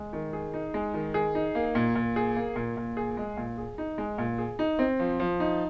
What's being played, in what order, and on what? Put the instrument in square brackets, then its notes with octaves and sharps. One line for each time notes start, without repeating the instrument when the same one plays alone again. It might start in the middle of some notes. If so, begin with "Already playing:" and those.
Already playing: [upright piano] G#3
D#3
G#4
D#4
G#3
D#3
G#4
D#4
A#3
A#2
A#2
G#4
A#3
A#2
A#2
G#4
G#3
A#2
G#4
D#4
G#3
A#2
G#4
D#4
C4
F3
F3
D#4